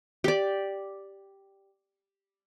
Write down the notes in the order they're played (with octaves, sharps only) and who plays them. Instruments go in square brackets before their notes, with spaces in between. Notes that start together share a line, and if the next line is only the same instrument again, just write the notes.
[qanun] G4 D5